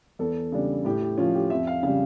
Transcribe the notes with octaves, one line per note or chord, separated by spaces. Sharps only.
E2 A4
C#3 G3 D4
A2 G4
G4
F3 C#4 F4
G4
F2 E5
F5
C#3 G3 F5